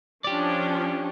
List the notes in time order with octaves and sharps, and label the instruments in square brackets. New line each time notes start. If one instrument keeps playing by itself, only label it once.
[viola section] F3 C#4 D4 [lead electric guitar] G4 D5